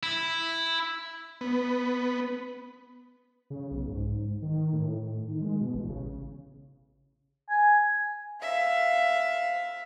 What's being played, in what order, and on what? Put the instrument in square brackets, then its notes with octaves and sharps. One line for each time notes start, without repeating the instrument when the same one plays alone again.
[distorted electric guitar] E4
[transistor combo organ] B3
[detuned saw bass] C#3
B1
G#2
D#3
A2
D#3
G#3
B2
A1
C#3
[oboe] G#5
[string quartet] E5 F5